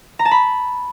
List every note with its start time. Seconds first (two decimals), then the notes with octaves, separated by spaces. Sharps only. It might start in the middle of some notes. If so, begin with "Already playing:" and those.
0.19 A#5
0.25 A5
0.31 B5